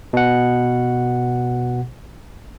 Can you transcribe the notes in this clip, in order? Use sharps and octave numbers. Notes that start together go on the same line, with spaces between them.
B2 F#5